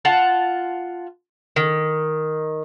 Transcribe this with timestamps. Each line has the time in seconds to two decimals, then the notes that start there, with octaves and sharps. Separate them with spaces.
0.05 F4 F#5 A5
1.56 D#3